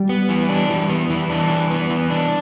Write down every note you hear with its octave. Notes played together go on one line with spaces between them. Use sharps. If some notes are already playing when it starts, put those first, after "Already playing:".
Already playing: G3
B3
E3
D4
E3 G3
B3
E3
D4
E3
B3
E3
D4